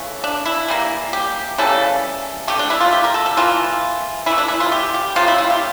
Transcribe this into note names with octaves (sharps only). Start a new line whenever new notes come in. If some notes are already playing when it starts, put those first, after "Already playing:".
Already playing: C#3 E3 A3
D4
E4
E3 G3 A#3
G4
C#3 E3 G3 A#3 A4
D3 A3 G4
D4
E4
F4
G4
A#4
A4
A4
E3 A#3 F4
E3 A3 E4
D4
E4
F4
G4
G4
C#3 F3 A#3 F4
E4
F4
G4